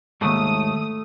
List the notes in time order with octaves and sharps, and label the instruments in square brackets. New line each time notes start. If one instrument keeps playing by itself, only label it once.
[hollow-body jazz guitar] D#2 G#2 [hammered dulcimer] A3 [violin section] D#6